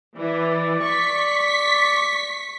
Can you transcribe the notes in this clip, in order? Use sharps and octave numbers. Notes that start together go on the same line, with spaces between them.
E3 D5
C#6 B6